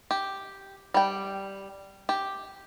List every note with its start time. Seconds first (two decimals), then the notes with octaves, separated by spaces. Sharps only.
0.11 G4
0.94 G3 G5
2.09 G4